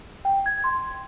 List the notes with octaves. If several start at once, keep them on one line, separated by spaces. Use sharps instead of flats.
G5
G#6
C6